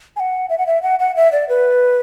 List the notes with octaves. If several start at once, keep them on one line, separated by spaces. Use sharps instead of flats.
G#5
F#5
E5
F#5
E5
F#5
F#5
E5
D5
B4